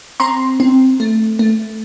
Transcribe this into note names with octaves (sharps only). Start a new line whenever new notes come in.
C4 A#5 C6
C4
A3
A3